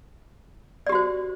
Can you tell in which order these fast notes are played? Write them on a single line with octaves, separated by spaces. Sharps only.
D5 G4 F#4 C5